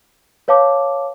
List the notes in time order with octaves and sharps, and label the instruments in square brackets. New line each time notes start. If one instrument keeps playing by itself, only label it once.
[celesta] B4 C#5 F5 A5 D6